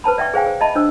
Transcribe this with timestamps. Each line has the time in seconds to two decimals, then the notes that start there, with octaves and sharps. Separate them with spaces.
0.04 B4 C5 A5 B5
0.18 D5 E5 G5 C#6
0.34 G#4 C5 F5 G5 G#5
0.47 C5
0.61 D#5 E5 A5 B5
0.75 D4 C5 E6